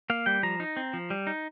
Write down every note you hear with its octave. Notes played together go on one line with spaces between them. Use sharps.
A#3 F5
G3 G5
F3 A#5
D#4
C4
F3
G3
D#4